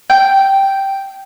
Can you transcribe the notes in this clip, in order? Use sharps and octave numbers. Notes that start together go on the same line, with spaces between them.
G5